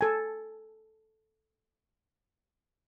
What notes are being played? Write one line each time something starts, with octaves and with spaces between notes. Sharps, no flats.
A4 G#5